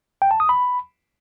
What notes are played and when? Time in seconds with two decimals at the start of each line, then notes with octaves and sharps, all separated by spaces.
0.22 G5
0.31 A5
0.40 D#6
0.49 B5